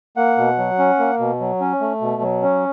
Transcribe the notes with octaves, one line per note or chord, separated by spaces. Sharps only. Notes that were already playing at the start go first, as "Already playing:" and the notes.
A#3 F#5
B2
F#3
C#4
A#3
B2
F#3
C#4
A3
B2
F#3
C#4